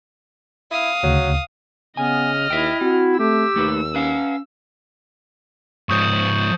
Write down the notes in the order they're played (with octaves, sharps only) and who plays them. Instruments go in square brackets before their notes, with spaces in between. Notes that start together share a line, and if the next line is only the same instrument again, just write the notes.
[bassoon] E4 [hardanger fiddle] F5 D#6
[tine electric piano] D2 C#3 [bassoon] F#3
[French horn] C#3 [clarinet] B3 [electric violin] D#5 F6 [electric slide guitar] G#5
[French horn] D#2 [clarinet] E4 [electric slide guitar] E5 G5
[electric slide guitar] C4 [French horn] F#4
[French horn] A3 [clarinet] G4 [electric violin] E6
[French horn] D#2 [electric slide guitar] A3 D#4 B4
[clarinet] C#4 [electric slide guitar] B4 F5 F#5
[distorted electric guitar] G#2 F3 [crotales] C#6 D#6 G6